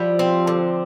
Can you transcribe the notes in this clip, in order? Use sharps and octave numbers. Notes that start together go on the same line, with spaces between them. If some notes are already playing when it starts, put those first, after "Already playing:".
Already playing: F3 G3 E4
C4
D3